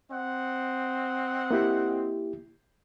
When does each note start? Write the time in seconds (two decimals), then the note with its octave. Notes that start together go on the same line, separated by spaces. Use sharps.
0.11 C4 D#5 F#5
1.51 A#3 E4 G4